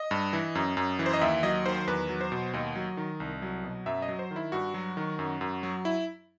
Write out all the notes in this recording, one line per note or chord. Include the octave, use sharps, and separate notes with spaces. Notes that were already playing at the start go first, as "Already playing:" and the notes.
Already playing: D#5
G2
E3
F#2
F#2
E3
C5
D#5
D#2 E5
F#3 D#5
D#3 C5
E2 B4
F#3
C5
B2
D#2 D#5
F#3
D#3
C2
F#3
B2
F#2 E5
D#5
F#3
C5
D#3
E4
G2 F#4
F#3
D#3
F#2
F#2
F#3
E4